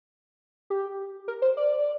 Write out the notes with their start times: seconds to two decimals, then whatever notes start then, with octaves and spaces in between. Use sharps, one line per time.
0.70 G4
1.28 A#4
1.42 C5
1.57 D5